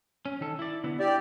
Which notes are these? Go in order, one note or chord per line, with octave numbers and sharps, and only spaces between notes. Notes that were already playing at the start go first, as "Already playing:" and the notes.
C#4
D#3 A4
E4 D5
D3 B3 E4
E4 G4 D5